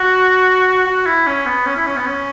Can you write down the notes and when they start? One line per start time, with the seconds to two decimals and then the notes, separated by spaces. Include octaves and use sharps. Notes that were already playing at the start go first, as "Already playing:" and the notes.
Already playing: F#4
0.86 F#4
1.06 E4
1.27 C#4
1.46 B3
1.66 C#4
1.77 E4
1.87 C#4
1.97 B3
2.06 C#4